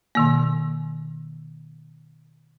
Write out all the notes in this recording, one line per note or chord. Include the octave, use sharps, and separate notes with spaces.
B2 D#3 A#3